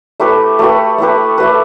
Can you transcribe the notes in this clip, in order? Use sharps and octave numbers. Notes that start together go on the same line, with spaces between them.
A3 E4 G4 B4
A3 E4 G4 B4
A3 E4 G4 B4
A3 E4 G4 B4